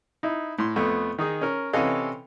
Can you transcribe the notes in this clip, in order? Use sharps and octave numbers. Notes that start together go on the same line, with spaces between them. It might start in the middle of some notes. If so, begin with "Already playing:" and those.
D#4 E4
A2 C6
F2 A3 B3
D#3 D#4 G#4
C#4 A#4
C3 E3 C#4 A4 D#5 F5